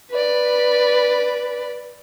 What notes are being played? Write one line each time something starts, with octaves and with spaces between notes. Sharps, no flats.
B4 D5